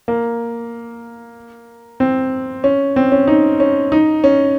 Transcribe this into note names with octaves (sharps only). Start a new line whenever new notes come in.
A#3
C4
C#4
C4
C#4
D#4
C#4
D#4
C#4